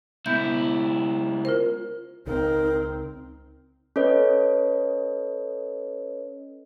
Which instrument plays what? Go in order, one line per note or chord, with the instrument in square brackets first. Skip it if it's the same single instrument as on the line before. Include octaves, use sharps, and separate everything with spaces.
[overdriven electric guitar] C#2 E4 [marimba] B3 G6
[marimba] F4 A#4 C5
[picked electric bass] C#2 [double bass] C4 [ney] D#4 [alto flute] A#4
[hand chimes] C#4 A4 B4 C#5 D#5